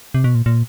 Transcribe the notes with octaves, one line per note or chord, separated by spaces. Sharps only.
C3
B2
A#2
A#2